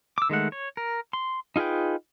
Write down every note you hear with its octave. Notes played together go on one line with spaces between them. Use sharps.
D6 E6
D#3 G#3 A3 F#5
C#5
A#4
C6
D#4 F4 G#4 B4 G5